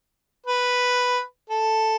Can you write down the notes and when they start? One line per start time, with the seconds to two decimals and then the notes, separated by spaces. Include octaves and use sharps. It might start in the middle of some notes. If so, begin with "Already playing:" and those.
0.46 B4
1.50 A4